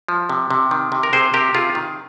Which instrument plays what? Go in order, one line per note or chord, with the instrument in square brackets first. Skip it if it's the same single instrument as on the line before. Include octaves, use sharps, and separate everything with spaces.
[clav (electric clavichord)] F3
C3
C3
D#3
C3
A#4
C3 G#4 C5
C3 G4 A#4
C3 F4 G#4
D#3